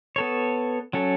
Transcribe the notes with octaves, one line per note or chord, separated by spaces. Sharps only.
B3 A4 C#5
F#3 C#4 A4